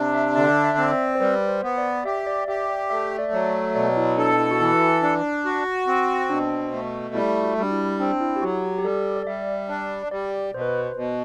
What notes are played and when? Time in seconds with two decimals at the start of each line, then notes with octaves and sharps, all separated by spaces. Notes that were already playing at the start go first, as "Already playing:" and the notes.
Already playing: C3 D4
0.15 E5
0.36 D3 D5
0.44 E5
0.52 D5
0.64 E5
0.78 C4
0.92 D5
1.15 C5
1.20 G3 B4
1.49 C5
1.63 B3
1.78 D5
2.05 G4 E5
2.27 D5
2.48 G4 E5
2.69 D5
2.90 A3 E5
3.19 D5
3.32 F#3
3.75 B2 D5
3.97 E4
4.17 D4 A4
4.39 E4
4.51 F#4
4.60 E3 E4
5.02 D4
5.45 F#4
5.87 C4
6.30 B2 D4
6.72 A3
7.15 G3 E4
7.43 F#4
7.58 G3
7.63 D4
7.71 E4
7.99 C4 D4
8.21 E4
8.36 G4
8.42 F#3 F#4
8.63 G4
8.79 G4
8.84 G3 A4
9.16 D5
9.26 G3 E5
9.69 D4 D5
10.11 G3 D5
10.54 B2 C5
10.61 B4
10.68 C5
10.82 B4
10.96 B2